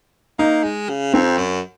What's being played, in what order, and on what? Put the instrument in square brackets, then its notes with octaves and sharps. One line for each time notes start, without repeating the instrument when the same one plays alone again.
[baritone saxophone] A#3 [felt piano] D#4
[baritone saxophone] G#3
C#3
[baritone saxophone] F2 [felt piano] C4
[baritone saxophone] F#2